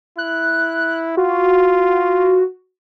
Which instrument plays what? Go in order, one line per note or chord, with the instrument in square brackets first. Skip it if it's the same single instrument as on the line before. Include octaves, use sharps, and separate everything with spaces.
[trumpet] E4 [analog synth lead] F#6
[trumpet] F4 [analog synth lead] F#4